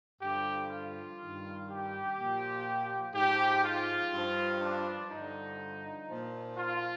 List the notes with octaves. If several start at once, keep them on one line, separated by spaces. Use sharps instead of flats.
G2 D3 F3 G4
F4
G2 D#3
G4
A#2
F3
G#2 F3 G4
F4
G2 F3
D4
G2 D3 F3 D#4
A#2 F3
F4